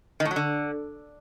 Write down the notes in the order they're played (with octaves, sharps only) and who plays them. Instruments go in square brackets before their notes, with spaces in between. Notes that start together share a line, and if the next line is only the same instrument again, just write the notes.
[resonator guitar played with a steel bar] D#3
A2
F#3
D3